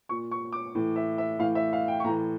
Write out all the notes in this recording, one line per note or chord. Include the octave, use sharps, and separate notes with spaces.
A#2 C#6
C#6
D6
A2 E3
E5
E5
A2 E3 F5
E5
F5
G5
C#6
A2 E3 A#5